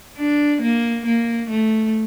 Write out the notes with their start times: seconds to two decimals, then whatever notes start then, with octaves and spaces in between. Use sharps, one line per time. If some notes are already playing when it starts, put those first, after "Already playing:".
0.17 D4
0.62 A#3
1.06 A#3
1.50 A3